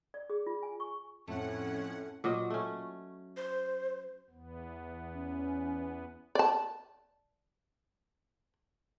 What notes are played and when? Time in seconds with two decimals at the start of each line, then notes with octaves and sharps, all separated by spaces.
0.14 D5
0.30 G#4
0.47 F4
0.63 G#5
0.80 C#6
1.28 F2 A2 A3 C#4 F#5
2.24 A#2 F#3 D#5
2.50 A3 C#4
3.37 C5
4.30 E2 B3
5.13 C#4
6.35 D5 A5